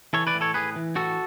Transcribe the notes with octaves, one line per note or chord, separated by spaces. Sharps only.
E3 A4 C#5
B4 D5
A2
A4 C#5
E3 G#4 B4
E3
A2 F#4 A4